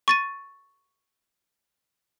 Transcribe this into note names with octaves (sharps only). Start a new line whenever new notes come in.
C#6 A6 D#7